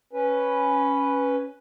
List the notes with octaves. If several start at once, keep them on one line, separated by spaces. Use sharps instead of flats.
C#4 B4